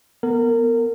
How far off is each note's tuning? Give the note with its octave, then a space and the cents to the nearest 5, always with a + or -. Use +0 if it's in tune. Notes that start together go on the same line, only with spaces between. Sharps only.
B3 -15 A#4 -25